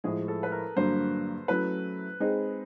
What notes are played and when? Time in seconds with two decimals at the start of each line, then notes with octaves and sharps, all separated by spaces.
0.04 A2 F3 G#3 G#4
0.28 A4
0.43 B4
0.52 A#4
0.76 G2 D3 F#3 A#3 C5
1.48 F#3 A3 C#4 E4 B4
2.20 G#3 C4 D#4 G#4